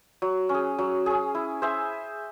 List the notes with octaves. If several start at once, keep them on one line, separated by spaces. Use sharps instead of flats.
F#3
C#4
G#4
F#3
C#4 G#4
E4
G#4 C5 E5